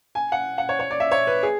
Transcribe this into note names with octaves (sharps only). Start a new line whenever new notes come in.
G#5
F#5
F#5
C#5
C#5
D5
E5
C#5
B4
G#4